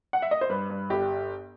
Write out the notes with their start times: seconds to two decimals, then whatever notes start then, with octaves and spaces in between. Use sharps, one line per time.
0.13 F#5
0.22 E5
0.31 D#5
0.41 C5
0.49 G2 B4
0.70 G2
0.90 G1 G4